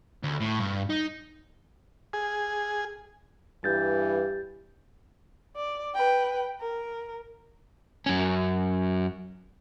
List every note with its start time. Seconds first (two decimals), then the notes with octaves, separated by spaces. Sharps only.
0.24 D2
0.40 A2
0.60 G2
0.90 D#4
2.13 G#4
3.64 G2 E3 G4 G6 A6
5.56 D5
5.94 B4 G5
6.61 A#4
8.06 F#2 C#4